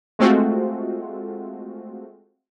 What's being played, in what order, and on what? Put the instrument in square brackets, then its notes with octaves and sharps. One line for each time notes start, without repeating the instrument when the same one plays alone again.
[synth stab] G#3 A3 C4 F4 F#4